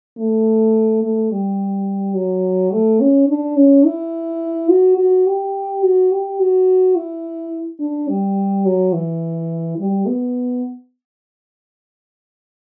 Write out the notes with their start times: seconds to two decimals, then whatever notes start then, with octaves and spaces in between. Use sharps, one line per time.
0.18 A3
1.03 A3
1.31 G3
2.16 F#3
2.72 A3
3.00 C#4
3.29 D4
3.56 C#4
3.86 E4
4.70 F#4
4.98 F#4
5.26 G4
5.83 F#4
6.11 G4
6.39 F#4
6.96 E4
7.80 D4
8.08 G3
8.65 F#3
8.93 E3
9.78 G3
10.06 B3